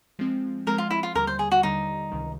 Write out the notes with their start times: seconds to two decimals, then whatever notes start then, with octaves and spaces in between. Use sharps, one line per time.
0.19 F3 G#3 C4
0.67 F3 G#3 C4 A#4
0.78 F4
0.91 E4
1.03 F4
1.15 D#2 D3 G3 A#4
1.27 C5
1.39 G#4
1.52 F#4
1.63 D#2 D3 G3 D#4
2.12 C#2 C3 D#3